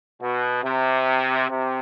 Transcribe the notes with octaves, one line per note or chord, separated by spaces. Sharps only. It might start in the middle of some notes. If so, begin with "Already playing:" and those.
B2
C3
C3